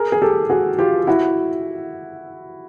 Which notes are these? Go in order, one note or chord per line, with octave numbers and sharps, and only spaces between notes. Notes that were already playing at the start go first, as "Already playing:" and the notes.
Already playing: G#4 A#4
G#4
G4 A4
F#4 G#4
F4 G4
E4 F#4